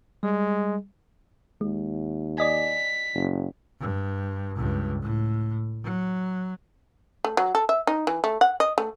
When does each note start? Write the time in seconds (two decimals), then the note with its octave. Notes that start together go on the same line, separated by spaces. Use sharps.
0.23 G3 G#3
1.61 D#2 G#3
2.38 D5 D#5 G#5 B6
3.15 F#1
3.80 G2
4.55 C#2 G2
5.02 A2
5.84 F#3
7.24 A3
7.37 F#3
7.55 A4
7.69 E5
7.87 D#4
8.07 E3
8.24 A3
8.41 F#5
8.60 D#5
8.78 A3